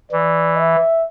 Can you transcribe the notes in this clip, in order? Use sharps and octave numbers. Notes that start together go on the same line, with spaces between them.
E3 D5
E5